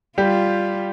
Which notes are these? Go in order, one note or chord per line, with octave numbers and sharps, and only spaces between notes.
G3 F4 G4